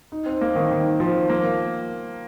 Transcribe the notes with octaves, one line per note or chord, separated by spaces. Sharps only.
D#4
C4
A#3
D#3
D#3
F3
A#3